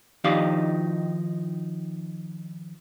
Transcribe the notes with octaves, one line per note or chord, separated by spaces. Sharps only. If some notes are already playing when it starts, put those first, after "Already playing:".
D#3 F3 D#4 G4 D5 F5